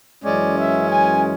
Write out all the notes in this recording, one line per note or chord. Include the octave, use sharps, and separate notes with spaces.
F#2 E3 G#3 C#4 D5
E5
G#5